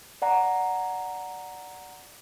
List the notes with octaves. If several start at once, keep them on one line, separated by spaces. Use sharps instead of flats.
D5 F#5 A#5